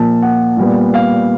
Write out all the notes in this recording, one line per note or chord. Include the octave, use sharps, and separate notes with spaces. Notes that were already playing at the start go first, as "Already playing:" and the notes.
Already playing: A#2 F3 A#3 A5
F#5
A#2 G3 B3
F5